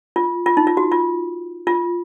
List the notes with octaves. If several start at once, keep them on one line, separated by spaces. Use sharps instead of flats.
F4
F4
D#4
F4
F#4
F4
F4